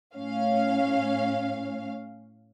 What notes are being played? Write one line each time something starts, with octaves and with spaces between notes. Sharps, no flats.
A2 C#4 F5